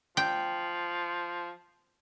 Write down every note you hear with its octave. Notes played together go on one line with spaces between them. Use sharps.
F3 G5